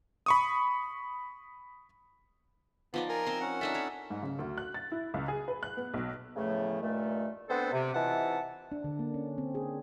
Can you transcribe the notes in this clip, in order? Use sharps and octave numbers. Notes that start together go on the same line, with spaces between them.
B5 C#6 D#6
F3 B3 D#4 D5
A#4 G#5
C4 C6
C#4 F#5
D4 D#4 A4 E5
A4 C#5
G#2
C#3
D2
F#6
A6
E4
C#2
G#4
B4
F#6
B3
B1
E2 A2 C#3 F3 A3
G2 A#2 D#3 A3
D3 B3 C4 D4 A4 C5
C3
C3 E3 D#4 F4 F#5 A5
D4
D3
A#3
C#4
C4
G#4